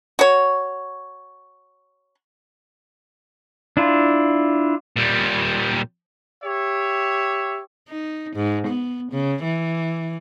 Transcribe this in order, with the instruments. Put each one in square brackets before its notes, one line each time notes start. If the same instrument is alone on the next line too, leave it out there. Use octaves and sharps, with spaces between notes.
[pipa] F#4 C#5
[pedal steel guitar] D4 E4 F4
[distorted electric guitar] A#2 G3
[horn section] G4 C#5 E5
[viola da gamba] D#4
G#2
B3
C#3
E3